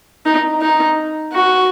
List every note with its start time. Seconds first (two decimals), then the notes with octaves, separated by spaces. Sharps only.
0.26 D#4
0.62 D#4
1.33 F#4